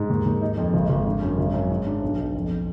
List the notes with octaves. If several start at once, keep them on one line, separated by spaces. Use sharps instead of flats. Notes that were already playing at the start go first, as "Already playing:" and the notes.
Already playing: G#2
D#2
D#2
D#4
F2
G#1
G#1
D3
F#2
G#1
F#2
G#2
D4
B1
B1
F2